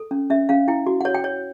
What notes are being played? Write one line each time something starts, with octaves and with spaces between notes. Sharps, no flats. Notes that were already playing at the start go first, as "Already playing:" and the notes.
Already playing: A4
C#4
C#4 E5
C#4 F5
E4 G5
F#4
C#5 F#5
G5
C#5